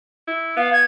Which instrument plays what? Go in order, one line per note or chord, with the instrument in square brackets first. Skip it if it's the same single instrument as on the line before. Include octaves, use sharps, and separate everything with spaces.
[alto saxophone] E4
[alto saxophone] B3 [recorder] F5
[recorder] G#6